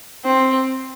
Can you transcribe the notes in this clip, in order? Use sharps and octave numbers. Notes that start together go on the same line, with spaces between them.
C4